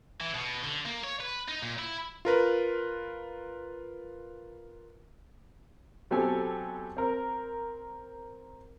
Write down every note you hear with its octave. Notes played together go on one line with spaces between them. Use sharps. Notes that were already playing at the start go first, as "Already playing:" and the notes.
E3
B2
D3
A#3
C#5
B4
D#4
A#2
E4
F4 A#4 B4
B2 F#3 C4 G4 A4 G#5
C4 A#4